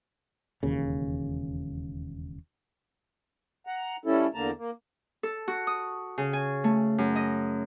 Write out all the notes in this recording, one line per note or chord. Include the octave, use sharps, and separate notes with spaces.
E1 D#2 C#3
F#5 A#5
G3 C#4 E4 A4
E2 D3 A#3 A5 A#5
A#3
A4
F#4
D#6
C#3
G#5
A3
F#2
D#5